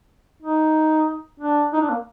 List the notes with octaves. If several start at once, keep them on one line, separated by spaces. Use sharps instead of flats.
D#4
D4
D#4
D4
A#3